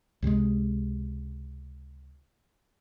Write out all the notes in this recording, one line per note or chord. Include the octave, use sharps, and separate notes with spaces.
C#2 C3 G3 G#3